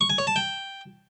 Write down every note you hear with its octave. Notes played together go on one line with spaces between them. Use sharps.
C#6
G#5
C#5
A5
G5